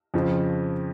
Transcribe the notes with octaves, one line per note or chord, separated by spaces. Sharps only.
F2 C#3 F3